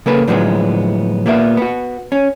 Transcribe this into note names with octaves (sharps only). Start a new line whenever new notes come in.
C#3 A#3 A4 B4
A2 D3 F3 F#3 G#3 B3
A#2 A#3 B3 E5
B3 F#4
C#4